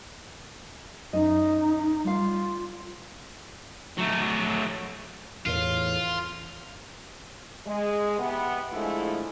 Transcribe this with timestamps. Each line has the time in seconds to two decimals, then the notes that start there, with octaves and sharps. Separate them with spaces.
1.13 F#2 D#4 D#5
2.04 G3 F4 F5
3.98 F#3 A3
5.46 E2 A2 F4
7.66 G#3
8.19 C3 E3 B3
8.73 D3 F3 G#3 A3 E4